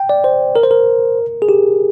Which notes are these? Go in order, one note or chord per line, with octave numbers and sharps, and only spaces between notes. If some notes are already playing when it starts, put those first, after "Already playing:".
Already playing: G5
D5
C5
A#4
C5
A#4
G#4
G4